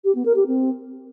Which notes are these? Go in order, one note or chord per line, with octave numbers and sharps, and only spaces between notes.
G4
B3
A#4
G4
C4